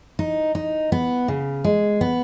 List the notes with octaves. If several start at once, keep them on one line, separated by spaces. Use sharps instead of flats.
D#4
D#4
B3
C#3
G#3
B3